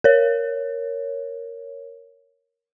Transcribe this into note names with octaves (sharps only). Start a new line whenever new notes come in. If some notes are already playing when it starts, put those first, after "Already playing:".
A#4 C#5